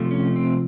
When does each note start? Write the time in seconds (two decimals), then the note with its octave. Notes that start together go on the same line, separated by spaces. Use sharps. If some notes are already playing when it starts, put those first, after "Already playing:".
Already playing: C3 F3 A3
0.11 C#4
0.36 C4